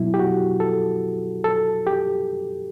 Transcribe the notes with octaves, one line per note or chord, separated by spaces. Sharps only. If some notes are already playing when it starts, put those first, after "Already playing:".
Already playing: B2 F#3 E4
G4
F#4
A4
A4
G4